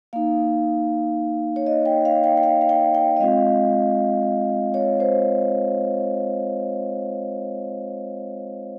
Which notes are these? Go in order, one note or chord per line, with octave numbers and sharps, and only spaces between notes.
A#3 D#4 F5
C#5
D#5
G5
F5
G5
G5
F5
F5
G5
G5
D#5
G#3 C4 F4 F5
C#5
C5